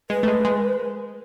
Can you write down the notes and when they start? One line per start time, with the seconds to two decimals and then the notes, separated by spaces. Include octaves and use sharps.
0.10 G#3 B4
0.23 A3
0.28 G#3
0.45 G#3